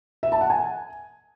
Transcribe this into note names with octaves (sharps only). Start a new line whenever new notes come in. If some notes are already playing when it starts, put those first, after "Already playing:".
E5
A5
F#5
G#5